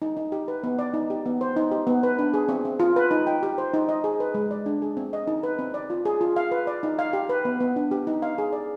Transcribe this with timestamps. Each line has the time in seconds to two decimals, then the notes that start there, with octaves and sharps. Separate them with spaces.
0.02 D#4
0.17 D#4
0.32 G4
0.48 B4
0.63 B3
0.79 D5
0.94 D#4
1.10 G4
1.26 B3
1.41 C5
1.56 D#4
1.71 G4
1.87 B3
2.03 B4
2.19 D4
2.34 G#4
2.49 C4
2.65 C4
2.80 F4
2.96 B4
3.11 D#4
3.27 G5
3.43 G4
3.58 C5
3.74 D#4
3.89 D#5
4.04 G#4
4.20 B4
4.34 G#3
4.51 D5
4.66 D4
4.82 G#4
4.97 C4
5.13 D#5
5.27 D#4
5.43 B4
5.59 C4
5.74 D5
5.90 F4
6.05 G#4
6.21 F4
6.36 F5
6.51 B4
6.67 D5
6.83 D#4
6.99 F5
7.13 G4
7.29 B4
7.45 B3
7.60 B3
7.76 D4
7.91 G4
8.07 D#4
8.22 F5
8.38 G#4
8.53 D5